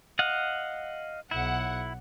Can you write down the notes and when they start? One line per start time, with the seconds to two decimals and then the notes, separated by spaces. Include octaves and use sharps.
0.19 D#5 F5 F#5
1.31 B1 E4 F#5